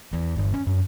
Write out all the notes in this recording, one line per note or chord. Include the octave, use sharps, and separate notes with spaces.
E2
G1
C#4
F#2